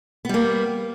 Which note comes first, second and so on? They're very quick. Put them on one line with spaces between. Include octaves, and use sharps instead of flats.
B3 G3 A#3